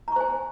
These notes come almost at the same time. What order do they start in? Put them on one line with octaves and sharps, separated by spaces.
A#5 C#6 C5 G#5